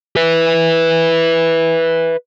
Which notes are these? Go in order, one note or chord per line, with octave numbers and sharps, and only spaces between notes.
B4 E5